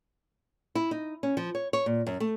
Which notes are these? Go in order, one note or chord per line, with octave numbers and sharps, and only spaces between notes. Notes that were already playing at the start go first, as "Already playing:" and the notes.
E4
D#4
C#4
F3
C#5
C#5
A#2
F#2
A3